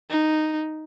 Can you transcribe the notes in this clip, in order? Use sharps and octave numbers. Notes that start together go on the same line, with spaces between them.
D#4